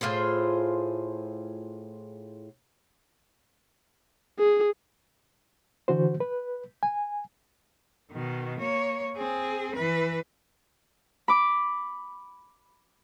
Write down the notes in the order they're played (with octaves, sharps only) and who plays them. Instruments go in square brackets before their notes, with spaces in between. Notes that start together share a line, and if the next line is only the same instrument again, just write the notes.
[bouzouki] A2 F4 G#4 C5
[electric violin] G#4
[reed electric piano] D3 E3 F#4 C5
B4
G#5
[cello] B2 D#3
A#3 C#5
C4 G#4
E3 B4
[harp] B5 D6